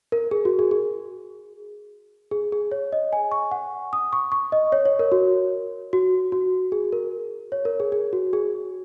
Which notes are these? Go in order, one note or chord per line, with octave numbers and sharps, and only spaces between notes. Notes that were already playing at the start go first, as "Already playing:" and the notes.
A#4
G#4
F#4
G#4
G#4
G#4
G#4
C#5
D#5
G#5
C#6
F#5
D#6
C#6
C#6
D#5
C#5
C#5
A#4
F#4
F#4
F#4
G#4
A#4
C#5
A#4
G#4
G#4
F#4
G#4